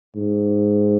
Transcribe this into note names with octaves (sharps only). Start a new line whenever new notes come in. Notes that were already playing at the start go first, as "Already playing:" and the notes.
G#2